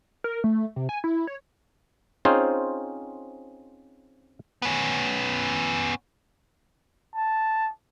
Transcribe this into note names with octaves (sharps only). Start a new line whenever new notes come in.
A#4
A3
C3
G#5
E4
C#5
C4 C#4 D#4 F4 G#4 C5
B3 C#4
A5